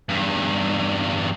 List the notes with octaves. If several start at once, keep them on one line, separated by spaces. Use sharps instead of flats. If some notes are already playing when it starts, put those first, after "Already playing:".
E2 G2